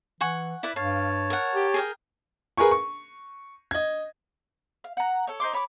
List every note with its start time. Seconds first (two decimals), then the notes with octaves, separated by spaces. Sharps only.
0.21 E3 F#5 G#5 C#6
0.63 E4 B4 D5
0.76 G2 C#5 F5 A5
1.30 A#4 F#5
1.55 G4
1.74 G#4 A#4 G5
2.57 G#4 A#4 B4 G#5 C#6
2.71 C#6
3.71 D#5 G#6
4.84 F5
4.97 F#5 A#5
5.27 A4 C#5
5.40 D#4 C5 C6 D6
5.53 C#5 B5 C#6 D6